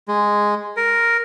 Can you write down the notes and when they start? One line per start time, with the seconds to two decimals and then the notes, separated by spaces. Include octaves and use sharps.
0.08 G#3
0.77 A#4